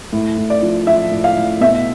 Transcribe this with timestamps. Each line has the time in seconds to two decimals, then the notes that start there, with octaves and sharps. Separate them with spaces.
0.12 A2
0.37 A2
0.50 D5
0.63 F3
0.87 F3 E5
1.11 A2
1.24 F5
1.36 A2
1.61 B2 E5